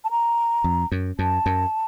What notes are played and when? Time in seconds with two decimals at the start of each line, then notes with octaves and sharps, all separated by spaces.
0.04 A5
0.11 A#5
0.64 F2
0.92 F#2
1.19 F#2 A5
1.46 F#2